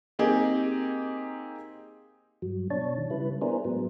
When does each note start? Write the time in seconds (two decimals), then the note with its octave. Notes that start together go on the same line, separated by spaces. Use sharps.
0.19 A#3 C4 D#4 G4 G#4
2.42 G2 F#3
2.70 B2 D4 C#5 A5
2.98 D#3
3.10 C#3 G3 E4 B4
3.41 B3 D4 E4 G#4 A#4 C5
3.65 A2 F#3 G#3 B3